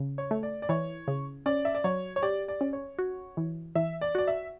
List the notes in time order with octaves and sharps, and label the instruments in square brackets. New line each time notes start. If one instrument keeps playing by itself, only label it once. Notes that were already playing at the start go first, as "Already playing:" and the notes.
Already playing: [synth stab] C#3
[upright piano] C#5
[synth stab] A3
[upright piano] D5
D5
[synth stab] E3 [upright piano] C#5
[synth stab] C#3
[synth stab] C#4 [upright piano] D5
[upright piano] E5
D5
[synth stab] F#3 [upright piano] C#5
[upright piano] C#5
[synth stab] G4 [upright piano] D5
[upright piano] D5
[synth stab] C#4
[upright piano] C#5
[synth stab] F#4
E3
[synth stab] E3 [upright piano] E5
[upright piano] D5
[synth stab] F#4 [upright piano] D5
[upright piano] E5